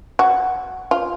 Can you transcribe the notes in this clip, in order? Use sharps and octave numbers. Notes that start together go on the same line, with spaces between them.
F#4
F4